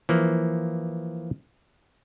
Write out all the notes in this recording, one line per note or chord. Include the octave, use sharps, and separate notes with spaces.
E3 F3 A#3